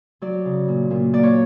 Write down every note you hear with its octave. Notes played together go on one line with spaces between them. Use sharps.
F#3 D5
C#3
A#2
A#2
A#3 D5
C#5